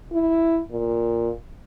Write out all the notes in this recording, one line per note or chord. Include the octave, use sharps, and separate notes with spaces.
E4
A#2